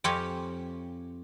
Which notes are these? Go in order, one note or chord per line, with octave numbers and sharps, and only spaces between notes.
F2 C4 F4 G4 C#5 G#5